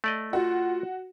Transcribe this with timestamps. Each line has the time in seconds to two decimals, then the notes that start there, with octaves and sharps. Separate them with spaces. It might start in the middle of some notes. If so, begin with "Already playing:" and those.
0.04 A3 D5 D#5
0.33 F4 F#4